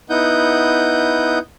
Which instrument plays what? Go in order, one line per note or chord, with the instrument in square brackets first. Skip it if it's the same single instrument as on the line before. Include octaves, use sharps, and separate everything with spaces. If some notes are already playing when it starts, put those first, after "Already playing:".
[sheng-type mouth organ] B3 D#4 E4 F#5 D#6 G6